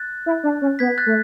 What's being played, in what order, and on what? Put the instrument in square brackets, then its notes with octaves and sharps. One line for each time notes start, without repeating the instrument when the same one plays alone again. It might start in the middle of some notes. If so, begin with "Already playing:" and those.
Already playing: [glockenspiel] F#6 A6
[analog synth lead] E4
D4
C#4
[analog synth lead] B3 [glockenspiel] G#6 B6
[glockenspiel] F#6 A6
[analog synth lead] A3